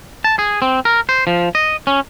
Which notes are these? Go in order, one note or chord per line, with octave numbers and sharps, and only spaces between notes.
A5
G#4
C4
A#4
C5
F3
D#5
C#4